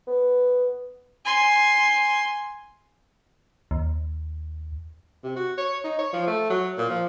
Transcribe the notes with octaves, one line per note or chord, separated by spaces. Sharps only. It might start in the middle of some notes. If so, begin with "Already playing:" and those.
B3
G#5 C6
D#2
C3
F#4
C#5
D#4
C#5
F3
A3
F#3
A#2
F3